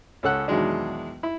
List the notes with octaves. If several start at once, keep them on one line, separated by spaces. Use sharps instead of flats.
C#2 C#4 A4 F#5 F#6
E2 B2 D#3 F#3 G#3 D4
E4